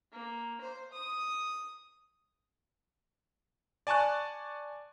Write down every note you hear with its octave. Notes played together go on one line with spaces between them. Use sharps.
A#3
C5
D#6
D5 G#5 A5 C#6 F#6